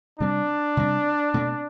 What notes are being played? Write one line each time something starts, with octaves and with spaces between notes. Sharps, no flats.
C3 G3 C4 D4
C3 G3 C4
B2 A3 C4